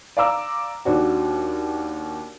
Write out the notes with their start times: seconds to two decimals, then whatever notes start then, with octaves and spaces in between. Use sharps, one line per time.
0.17 D5 F5 A#5 D6 E6
0.85 D#2 D4 F#4